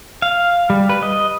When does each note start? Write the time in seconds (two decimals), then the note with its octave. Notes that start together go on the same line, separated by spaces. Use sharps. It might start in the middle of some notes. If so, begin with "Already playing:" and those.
0.22 F5
0.70 G3
0.89 B4
1.03 D#5